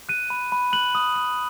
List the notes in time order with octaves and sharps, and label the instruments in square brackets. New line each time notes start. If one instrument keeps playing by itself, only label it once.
[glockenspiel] F#6 D#7
B5
B5
F#6 F#7
D#6
D#6